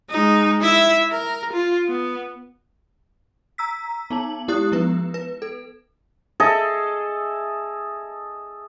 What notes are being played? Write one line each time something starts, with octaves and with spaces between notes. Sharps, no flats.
G#3 D#4
E4 E5
A#4
F4
B3
A#5 E6 B6
B3 D#4 A5 F#7
G#3 E4 G4 D#6 F#6
F3 B3 B4
B4
A4
G#4 A4 D#5 E5